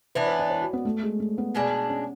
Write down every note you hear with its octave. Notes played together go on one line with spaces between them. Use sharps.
E3 B3 D4 B4
C#5
D5
C#5
F#4
B3
A3
G#3
A3
B3
B2 G#3 D4
C#4